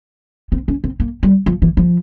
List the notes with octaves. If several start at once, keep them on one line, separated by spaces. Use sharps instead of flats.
C4
C#4
C4
A#3
G3
F3
E3
F3